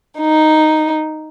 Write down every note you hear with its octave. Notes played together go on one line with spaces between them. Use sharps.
D#4